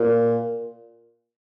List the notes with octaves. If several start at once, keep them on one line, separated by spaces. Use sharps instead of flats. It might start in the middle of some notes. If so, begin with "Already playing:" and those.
Already playing: A#2